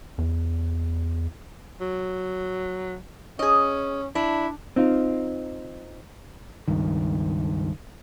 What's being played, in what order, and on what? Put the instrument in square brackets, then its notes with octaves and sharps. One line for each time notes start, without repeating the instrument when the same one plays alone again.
[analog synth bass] E2
[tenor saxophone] F#3
[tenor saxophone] C#4 [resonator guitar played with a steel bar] G#4 D#5
[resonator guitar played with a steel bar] D4 [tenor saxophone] E4
[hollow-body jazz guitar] C4 D#4 F4
[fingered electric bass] C#2 G2 D#3